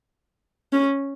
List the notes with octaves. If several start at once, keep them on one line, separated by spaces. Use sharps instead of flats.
C#4